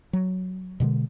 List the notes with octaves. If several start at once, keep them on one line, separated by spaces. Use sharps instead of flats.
F#3
B2 D3 G3 G#3